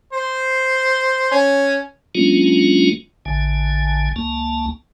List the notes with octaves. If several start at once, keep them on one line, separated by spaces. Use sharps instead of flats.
C5
C#4
F#3 G#3 A#3 C#4 D4 F4
A1 D3 G#5
C#2 A#3 A5